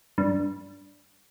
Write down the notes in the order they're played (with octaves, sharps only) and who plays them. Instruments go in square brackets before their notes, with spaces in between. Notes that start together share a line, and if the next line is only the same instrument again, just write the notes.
[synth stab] G2